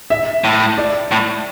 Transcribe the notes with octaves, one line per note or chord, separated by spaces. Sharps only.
E5
A2
D5
A2